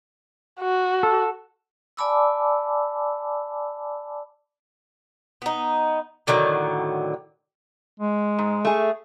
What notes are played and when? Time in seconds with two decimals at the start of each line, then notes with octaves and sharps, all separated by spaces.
0.61 F#4
1.03 A4
1.97 D5 G#5 A5 B5 D6 E6
5.42 B3 D#4
6.27 A2 D3 D#3 F#3
8.00 G#3
8.38 G#2
8.65 A3 G#4